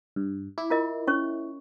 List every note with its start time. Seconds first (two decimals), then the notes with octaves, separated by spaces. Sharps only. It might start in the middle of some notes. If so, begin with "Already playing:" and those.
0.16 G2
0.58 E4 D6
0.70 F4 A#4 D#5
1.08 C#4 C#5 C#6